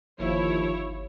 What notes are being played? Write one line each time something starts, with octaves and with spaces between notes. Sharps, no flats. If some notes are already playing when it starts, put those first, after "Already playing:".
G1 D#2 F3 E4 C#5